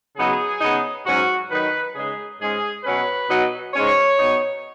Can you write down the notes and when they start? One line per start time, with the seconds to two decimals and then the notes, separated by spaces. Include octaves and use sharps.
0.17 C#3 F#3 B3 D#4 G#4
0.61 C#3 B3 D#4
1.05 G#2 F#3 C#4 F#4
1.50 D#3 F#3 D#4 B4
1.95 C#3 G#3 D#4 G#4
2.40 G#2 G#3 C#4 G#4
2.84 B2 F#3 C#4 B4
3.29 B2 F#3 D#4
3.74 G#2 G#3 C#4 C#5
4.18 B2 B3 D#4